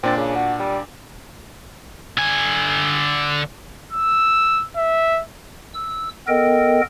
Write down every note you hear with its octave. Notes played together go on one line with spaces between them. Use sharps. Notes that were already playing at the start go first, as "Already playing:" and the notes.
A#2 C4 D4 A6
C#3
F#4
G3
D3 G#5
E6
E5
E6
B3 A4 A#4 D#5 G5